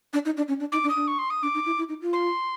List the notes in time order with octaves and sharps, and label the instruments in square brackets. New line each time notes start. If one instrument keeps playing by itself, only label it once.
[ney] D4
D#4
D4
C#4
D4
[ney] D#4 [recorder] D6
[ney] D4
[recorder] D#6
[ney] D4
[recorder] C#6
C6
D#6
[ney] D4 [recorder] D6
[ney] D#4
E4
E4
D#4
F4
[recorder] C6